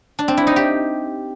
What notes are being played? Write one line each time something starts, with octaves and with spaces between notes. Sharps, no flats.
D4
C4
E4
D#4
G4